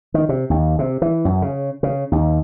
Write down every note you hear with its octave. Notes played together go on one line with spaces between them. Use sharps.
D#3
C3
D#2
C3
E3
F#2
C#3
C#3
D#2